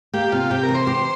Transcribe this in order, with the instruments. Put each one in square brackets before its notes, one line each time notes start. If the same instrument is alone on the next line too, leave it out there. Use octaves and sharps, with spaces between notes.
[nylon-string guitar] A#3 [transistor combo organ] G4
[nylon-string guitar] C3 [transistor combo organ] F4
[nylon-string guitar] C3 [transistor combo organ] G4
[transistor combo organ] A#4
[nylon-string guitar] E3
[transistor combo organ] C5
[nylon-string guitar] G4